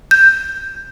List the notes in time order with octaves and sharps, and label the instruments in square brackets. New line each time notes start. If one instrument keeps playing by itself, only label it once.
[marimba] G6